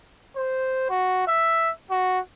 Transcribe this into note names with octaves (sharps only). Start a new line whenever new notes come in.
C5
F#4
E5
F#4